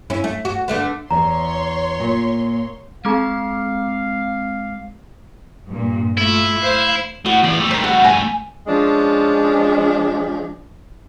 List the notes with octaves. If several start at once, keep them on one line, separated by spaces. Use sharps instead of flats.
C#4 E4
A3
F#4
D3 A3 B3
E2 C#5 A#5 C6
A#2
G#3 C4 F5 A5 D6 F6
G2 A#2
A3 E4 F4
C5 F5
A2 F#4
E2 F3 D5
G3 A3
D#3 C4
F#4
G#5
F3 G#3 C#4 D4